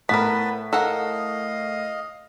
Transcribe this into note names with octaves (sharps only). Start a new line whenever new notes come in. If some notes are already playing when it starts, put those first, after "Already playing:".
A2 B3 A#4 B4 A5 B6
A4 A#4 D#5 F5 F#5